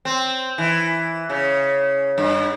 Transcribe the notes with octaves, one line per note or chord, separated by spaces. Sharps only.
C4
E3
C#3
G2